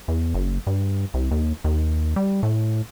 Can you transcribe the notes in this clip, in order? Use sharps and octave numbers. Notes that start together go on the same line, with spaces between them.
E2
F#1
G2
C2
D#2
D#2
G3
A2